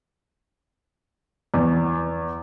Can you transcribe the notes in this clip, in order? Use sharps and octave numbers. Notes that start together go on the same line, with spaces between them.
E2